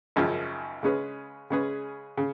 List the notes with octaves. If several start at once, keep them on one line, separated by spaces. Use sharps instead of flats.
G#1 F#2 C#3 F3
C#3 G#3 C#4 G#4 B4
C#3 G#3 C#4 G#4 B4
C#3